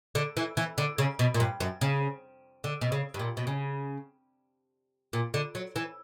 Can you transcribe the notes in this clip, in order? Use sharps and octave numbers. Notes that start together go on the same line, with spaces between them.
D3
E3
E3
D3
C#3
B2
A#2
G2
F#2
C#3
D3
B2
C#3
G2
A#2
B2
C#3
A#2
D3
F#3
E3